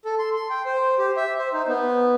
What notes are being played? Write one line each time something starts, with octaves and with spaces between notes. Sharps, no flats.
A4
C6
C6
G5
C5
G4
E5
C5
D#4
B3